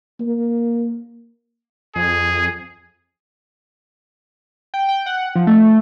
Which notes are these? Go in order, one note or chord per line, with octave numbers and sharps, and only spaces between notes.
A#3
F2 G#4
G5
G5
F#5
F3
A3